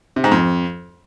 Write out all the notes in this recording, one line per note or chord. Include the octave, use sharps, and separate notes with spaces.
C3
G#2
F2